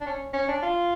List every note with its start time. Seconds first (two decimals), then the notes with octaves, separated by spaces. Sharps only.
0.01 D4
0.07 C#4
0.34 C#4
0.48 D4
0.63 F4